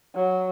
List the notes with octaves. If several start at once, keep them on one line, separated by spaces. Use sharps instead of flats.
F#3